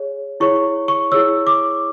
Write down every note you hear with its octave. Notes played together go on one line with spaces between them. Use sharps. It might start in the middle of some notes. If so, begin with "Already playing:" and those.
Already playing: G#4 C#5
E4 G#4 C#5 C#6
C#6
E4 G#4 C#5 E6
D6